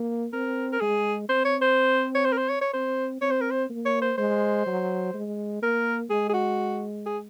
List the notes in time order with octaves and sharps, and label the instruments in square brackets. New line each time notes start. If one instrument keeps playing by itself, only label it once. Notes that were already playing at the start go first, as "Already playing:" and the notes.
Already playing: [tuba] A#3
[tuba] C4 [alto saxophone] A#4
[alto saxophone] A#4
[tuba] G#3 [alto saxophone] G#4
[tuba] C4 [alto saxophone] C5
[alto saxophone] C#5
C5
C#5
C5
A#4
C5
C#5
C#5
[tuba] C4 [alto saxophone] C5
[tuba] C4 [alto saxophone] C#5
[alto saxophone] C5
A#4
C5
[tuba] A#3
[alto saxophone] C#5
C5
[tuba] G#3 [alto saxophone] C5
[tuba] F#3
G#3
[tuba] A#3 [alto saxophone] A#4
[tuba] G#3 [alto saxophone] G#4
[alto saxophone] G#4
F#4
G#4